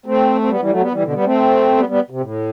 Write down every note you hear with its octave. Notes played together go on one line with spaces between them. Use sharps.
A3 C4
C4
G3 B3
E3 G3
F#3 A3
G3 B3
E3 G3
B2 D3
G3 B3
A3 C4
G3 B3
G3 B3
C3
A2